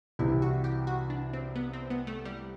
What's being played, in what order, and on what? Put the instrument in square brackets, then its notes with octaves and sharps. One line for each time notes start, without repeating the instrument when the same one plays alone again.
[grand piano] C2 C3 E3 [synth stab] E4
[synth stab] F#4
G4
F#4
D4
C4
B3
C4
B3
A3
G3